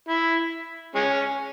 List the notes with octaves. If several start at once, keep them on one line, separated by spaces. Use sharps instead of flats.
E4
G#3 C#4